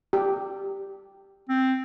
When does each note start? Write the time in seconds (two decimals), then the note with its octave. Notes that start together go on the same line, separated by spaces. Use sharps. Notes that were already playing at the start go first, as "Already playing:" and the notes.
0.13 G4
1.49 C4